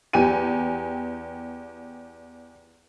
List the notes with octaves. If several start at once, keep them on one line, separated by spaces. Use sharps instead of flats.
E2 G4 G5 G#5 D#7